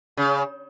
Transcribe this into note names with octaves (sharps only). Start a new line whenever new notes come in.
C#3